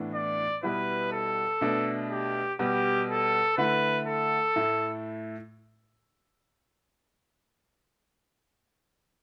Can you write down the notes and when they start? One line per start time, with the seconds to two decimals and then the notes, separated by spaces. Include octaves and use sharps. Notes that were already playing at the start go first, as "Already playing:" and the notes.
Already playing: A2 E3 B3 D4
0.14 D5
0.63 B2 G3 B3 E4 B4
1.12 A4
1.61 B2 A3 D4
2.10 G4
2.59 B2 G3 B3 G4
3.09 A4
3.57 D3 A3 E4 B4
4.07 A4
4.56 A2 A3 E4